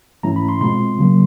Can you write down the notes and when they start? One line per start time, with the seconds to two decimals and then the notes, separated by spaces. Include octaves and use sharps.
0.23 G#2 E3 A3 C#4 E4 A#5
0.36 B5
0.49 C6
0.61 B2 G#3 C4 F4 C6
0.99 C#3 F#3 A#3